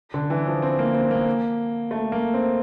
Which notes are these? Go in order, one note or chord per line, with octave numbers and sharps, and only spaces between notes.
D3
E3
F3
C4
A#3
C4
A#3
A3
A#3
C4